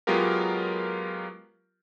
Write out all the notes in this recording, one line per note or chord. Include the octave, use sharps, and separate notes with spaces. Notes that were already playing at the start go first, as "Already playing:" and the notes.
F#3 G#3 B3 F4 G4 A#4